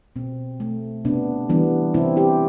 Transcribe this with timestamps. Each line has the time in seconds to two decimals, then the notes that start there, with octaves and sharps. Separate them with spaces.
0.16 B2 C4
0.60 A3
1.05 C3 B3 D4
1.49 E3 G3 B3 D4
1.94 C3 C4 E4
2.16 E4 G4